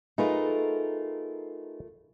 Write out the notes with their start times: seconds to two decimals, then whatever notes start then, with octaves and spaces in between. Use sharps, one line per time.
0.18 A3 D#4 F4 G#4 A#4 B4